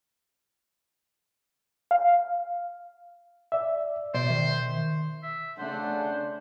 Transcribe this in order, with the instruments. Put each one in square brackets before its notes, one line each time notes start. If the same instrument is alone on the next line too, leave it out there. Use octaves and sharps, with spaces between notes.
[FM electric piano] F5
[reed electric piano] D5 E5
[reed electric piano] B2 [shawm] C5 [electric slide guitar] D5
[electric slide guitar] D#3 E5
[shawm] E5
[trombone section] C#3 D4 [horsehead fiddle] A3 F#5 [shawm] C5